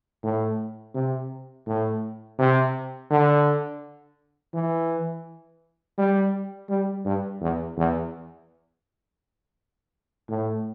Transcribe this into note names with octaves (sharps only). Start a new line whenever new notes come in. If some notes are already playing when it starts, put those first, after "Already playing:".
A2
C3
A2
C3
D3
E3
G3
G3
G2
E2
E2
A2